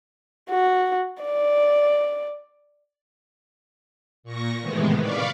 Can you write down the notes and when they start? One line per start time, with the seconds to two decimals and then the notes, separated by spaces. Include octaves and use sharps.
0.49 F#4
1.23 D5
4.23 A#2 C#6 A#6
4.61 A2 C3 D#3 E3 G#3 B3
5.00 D5 F5 B5 C#6 D6